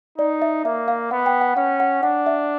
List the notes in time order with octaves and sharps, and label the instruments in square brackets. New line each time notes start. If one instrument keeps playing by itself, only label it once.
[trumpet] D#4 [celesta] D5
[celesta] E5
[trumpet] A#3 [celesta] E5
[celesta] F5
[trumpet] B3 [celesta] F#5
[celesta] G5
F#5
[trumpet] C#4 [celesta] F#5
[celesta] F#5
[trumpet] D4 [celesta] F#5
[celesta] E5